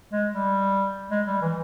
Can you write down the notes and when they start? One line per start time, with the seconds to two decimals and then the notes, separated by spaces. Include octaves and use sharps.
0.12 G#3
0.32 G3
1.11 G#3
1.27 G3
1.42 E3